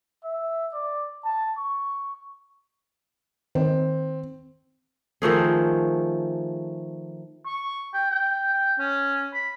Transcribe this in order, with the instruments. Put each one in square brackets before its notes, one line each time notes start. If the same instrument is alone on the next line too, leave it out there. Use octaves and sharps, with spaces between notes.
[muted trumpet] E5
D5
A5
C#6
[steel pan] D#3 [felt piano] C4
[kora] D#3 F3 A3 G#4
[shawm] C#6
G5
G5
G5
C#4
B5